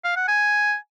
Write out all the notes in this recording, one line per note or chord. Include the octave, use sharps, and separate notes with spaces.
F5
F#5
G#5